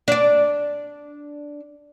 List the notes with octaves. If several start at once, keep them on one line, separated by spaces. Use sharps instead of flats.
D4 D5